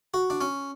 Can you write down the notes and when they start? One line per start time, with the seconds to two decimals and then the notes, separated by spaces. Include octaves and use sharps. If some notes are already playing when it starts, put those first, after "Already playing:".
0.14 F#4
0.30 D4
0.41 C#4